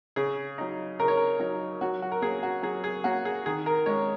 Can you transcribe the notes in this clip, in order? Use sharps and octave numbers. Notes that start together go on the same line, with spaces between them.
C#3 G#4
F#3 D#4
C#3 A#4
C#5
A#4
F#3 D#4
F#3 F#4
F#4
A#4
A#3 C#4 G#4
F#4
F#3 G#4
G#4
A#3 C#4 F#4
G#4
D#3 G#4
A#4
G#3 C#4 C#5